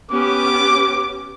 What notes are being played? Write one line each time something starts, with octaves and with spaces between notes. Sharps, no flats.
B3 C#4 G4 D6